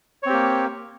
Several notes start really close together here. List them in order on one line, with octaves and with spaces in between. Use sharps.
C#5 C4 G4 A#3